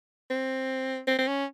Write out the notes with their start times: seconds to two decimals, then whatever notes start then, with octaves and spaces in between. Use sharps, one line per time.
0.30 C4
1.07 C4
1.19 C4
1.27 C#4